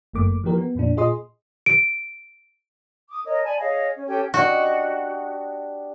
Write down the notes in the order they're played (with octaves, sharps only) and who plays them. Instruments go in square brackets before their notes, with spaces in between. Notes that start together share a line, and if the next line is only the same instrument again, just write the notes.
[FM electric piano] G1 F#2 A3 A#3 D6
E3 F3 A#3 G4 A#4
B3
F2 A#2 A#3 D4
A#2 F4 G#4 D#5 C6 D#6
[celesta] D7
[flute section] D6 D#6
A#4 C#5 D#5
D5 G#5 A5 B5
G#4 C#5 D#5 F5
C#4
C#4 G4 A4 G5
[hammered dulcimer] D4 G4 D#5 [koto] F#4